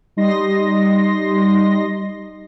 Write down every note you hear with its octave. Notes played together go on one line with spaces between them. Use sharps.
G3 D#4 D#5 C6 A#6